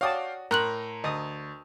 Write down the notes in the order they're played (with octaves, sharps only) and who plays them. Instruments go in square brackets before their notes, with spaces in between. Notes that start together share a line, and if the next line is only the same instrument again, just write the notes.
[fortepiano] F#4 D#6 [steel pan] C#5 D5 A5 [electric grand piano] F5 G5
[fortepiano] A2 [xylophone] A#4 F#6 F#7 [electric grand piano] A#5 C6
[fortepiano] D2 [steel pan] D#5 D#6